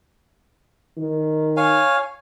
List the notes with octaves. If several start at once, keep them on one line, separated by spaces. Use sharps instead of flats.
D#3
C#5 F5 G#5